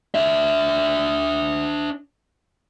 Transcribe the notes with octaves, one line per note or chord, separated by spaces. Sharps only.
D4 E5